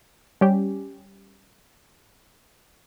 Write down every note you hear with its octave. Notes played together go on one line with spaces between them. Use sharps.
G3 C#4 G4